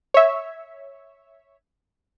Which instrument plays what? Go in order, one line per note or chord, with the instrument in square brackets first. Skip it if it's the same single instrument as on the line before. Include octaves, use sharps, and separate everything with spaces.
[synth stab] C#5 E5